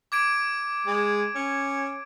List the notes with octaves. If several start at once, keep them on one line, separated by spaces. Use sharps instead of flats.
D6 G#6 D7
G#3
C#4